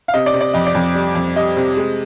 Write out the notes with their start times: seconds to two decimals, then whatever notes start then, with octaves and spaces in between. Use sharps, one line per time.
0.08 F5
0.14 C3 D#5
0.26 D5
0.34 C3
0.41 D5
0.54 F2 D#5
0.67 D5
0.75 F2
0.95 G3
1.15 F2
1.36 G3 D#5
1.57 C3
1.77 G#3